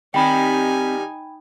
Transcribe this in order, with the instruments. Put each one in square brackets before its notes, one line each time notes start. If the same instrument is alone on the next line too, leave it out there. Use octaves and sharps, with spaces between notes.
[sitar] D#3 G3 [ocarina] C4 [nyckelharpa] D#4 G#5 [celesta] G5 B5